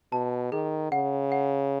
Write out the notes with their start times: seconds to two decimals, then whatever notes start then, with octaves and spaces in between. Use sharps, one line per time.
0.12 B2 A5
0.52 D#3 G#4
0.91 C#3 F#5
1.32 F#5